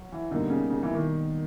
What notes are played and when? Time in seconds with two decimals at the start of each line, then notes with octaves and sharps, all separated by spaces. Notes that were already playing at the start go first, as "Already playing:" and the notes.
Already playing: F#3
0.12 E3
0.31 B2 D3 G3 A#3 D#4
0.50 C#3
0.70 C#3
0.83 E3
0.95 D#3